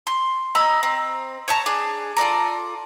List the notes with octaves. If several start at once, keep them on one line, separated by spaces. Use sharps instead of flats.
C6
D#5 A#5 B5 E6
C4
C#5 E5 A5 A#5
D4 G#4
F4 A4 D5 A#5